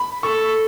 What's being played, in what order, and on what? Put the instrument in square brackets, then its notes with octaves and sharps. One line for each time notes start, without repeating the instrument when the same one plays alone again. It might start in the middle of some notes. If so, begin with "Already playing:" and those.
Already playing: [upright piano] B5
[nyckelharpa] A4 [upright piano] C#6